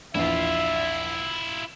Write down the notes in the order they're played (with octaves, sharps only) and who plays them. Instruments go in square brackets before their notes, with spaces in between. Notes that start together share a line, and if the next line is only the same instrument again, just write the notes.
[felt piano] A#1 E2 [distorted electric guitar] E4 F4 [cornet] E5